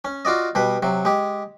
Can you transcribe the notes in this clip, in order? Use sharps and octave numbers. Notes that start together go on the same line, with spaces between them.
C#4
F4 F#4 D5 D#5
B2 G3 B4
C3 F#3
G#3 G4